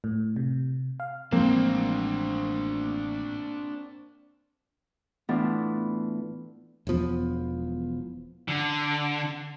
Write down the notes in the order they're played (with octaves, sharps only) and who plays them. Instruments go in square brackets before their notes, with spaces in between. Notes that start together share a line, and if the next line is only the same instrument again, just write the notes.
[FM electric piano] A2
C3
F5
[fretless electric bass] A1 F3 G#3 [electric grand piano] A#3 C4 [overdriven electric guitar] D4 C5
[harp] A2 E3 B3 D4 E4 F4
[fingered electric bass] E1 E2 F3 B3
[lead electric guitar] D3